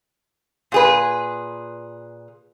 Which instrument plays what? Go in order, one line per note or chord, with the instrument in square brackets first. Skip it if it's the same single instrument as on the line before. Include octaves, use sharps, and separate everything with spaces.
[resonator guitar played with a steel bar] A#2 G#4 B4